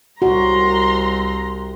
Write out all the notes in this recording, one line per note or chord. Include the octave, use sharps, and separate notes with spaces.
C2 F#4 A#5 C6